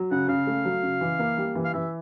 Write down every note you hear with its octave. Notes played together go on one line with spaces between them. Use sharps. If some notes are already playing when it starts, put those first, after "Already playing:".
Already playing: F#3
C#3 F#5
C#3 F5
A3
F#3
C#3
E3
A#3
G3
E3
F5
E3 E5